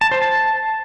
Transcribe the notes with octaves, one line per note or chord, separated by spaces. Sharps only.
A5
C5
A5